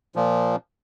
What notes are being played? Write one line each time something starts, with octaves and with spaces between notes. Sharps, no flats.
A#2 F3